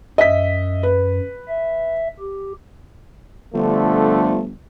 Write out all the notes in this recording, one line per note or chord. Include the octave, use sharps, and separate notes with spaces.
F#2 D#5 E5 B6
B4
E5
G4
G1 D3 F3 A3